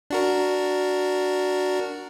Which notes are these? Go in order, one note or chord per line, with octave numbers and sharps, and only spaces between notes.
D4 F#4 A#4